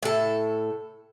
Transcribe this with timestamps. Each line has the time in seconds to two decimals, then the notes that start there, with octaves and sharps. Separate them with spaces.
0.03 A2 A4